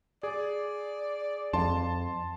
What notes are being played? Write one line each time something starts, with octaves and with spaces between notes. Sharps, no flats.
G#4 D5
F2 A5 C6